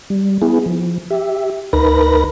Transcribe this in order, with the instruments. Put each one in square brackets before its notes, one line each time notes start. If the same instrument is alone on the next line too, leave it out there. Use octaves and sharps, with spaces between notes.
[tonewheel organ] G3
B3 E4 G#4
F3
G4 E5
D2 D#4 A#4 B4 B5 A#6